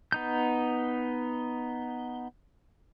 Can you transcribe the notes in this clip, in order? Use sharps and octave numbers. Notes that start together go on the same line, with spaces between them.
B3 D#4 G6